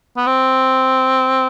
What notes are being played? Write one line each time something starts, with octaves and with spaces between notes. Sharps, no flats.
B3
C4